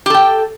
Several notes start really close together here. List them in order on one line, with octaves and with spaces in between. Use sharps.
G4 A4 G5